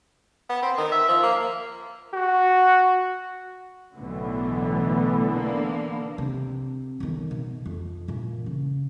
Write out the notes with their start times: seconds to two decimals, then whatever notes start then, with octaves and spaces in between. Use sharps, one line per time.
0.49 B3
0.63 C4
0.78 D#3
0.92 E5
1.09 F3
1.23 A#3
2.14 F#4
3.97 B1 A2 D3 E3 B3
5.31 A#3 D4
6.18 C3
7.00 B1 D#3
7.31 B2
7.65 F2
8.08 A#2 E3
8.46 C#3